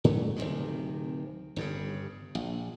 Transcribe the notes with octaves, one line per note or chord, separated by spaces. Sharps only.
G#2 D3 F#3 A3
D1 G#1 C3 D#3
G1 G2 A#2 C#3
A#1